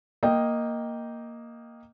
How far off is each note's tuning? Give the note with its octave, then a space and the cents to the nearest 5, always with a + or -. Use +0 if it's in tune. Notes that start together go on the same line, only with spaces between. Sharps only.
A#3 +0 D#5 +0 G5 +0